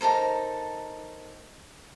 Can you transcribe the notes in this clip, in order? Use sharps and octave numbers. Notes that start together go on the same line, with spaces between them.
D#4 A4 A#4 C5